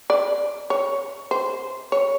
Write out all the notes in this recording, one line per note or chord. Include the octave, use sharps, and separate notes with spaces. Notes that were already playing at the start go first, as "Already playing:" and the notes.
D5
C#5
C5
C#5